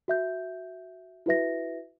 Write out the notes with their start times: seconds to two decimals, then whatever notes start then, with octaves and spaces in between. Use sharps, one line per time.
0.08 F#4 E5 G6
1.26 E4 F#4 B4 E5 A#6